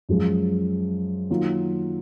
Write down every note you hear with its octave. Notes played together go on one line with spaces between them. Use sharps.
F#2 F3 G#3
D#3 F#3 A#3 F4